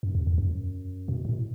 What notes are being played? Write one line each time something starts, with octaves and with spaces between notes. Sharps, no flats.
F#2
E2
E2
F#2
B2
A2